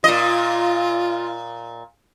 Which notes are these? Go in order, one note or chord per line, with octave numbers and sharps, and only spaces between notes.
A#2 F4 D#5